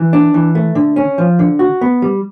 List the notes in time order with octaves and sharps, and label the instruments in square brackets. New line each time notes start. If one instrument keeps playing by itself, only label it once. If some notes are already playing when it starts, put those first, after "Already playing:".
Already playing: [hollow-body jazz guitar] E3
D4
E3
A3
D3
C#4
F3
D3
F#4
B3
G3